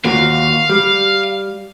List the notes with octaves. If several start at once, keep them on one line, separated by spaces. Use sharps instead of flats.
D#2 A#2 F#4 F5
G3